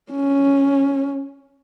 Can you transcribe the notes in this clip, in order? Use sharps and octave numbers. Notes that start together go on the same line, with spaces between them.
C#4